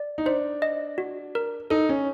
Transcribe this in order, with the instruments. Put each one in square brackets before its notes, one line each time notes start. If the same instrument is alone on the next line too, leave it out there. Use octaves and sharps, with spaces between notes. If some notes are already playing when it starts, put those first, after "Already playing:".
Already playing: [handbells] D5
[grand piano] D#4
[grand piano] D4 [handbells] C5
[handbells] D#5
F#4
A#4
[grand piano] D#4 [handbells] A4
[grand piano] C#4